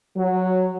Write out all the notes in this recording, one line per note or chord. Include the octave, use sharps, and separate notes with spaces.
F#3